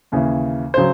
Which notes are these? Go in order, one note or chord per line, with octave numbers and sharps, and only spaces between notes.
D#2 C#3 E3
C#3 F#3 C5